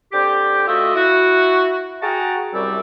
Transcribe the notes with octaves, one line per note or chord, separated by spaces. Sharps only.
D3 C4 G4
A3 F4 F#4 D#5 E5
E4 F#4
F#4 G#4 G5 A5 A#5
C2 F#2 G3 D5 E5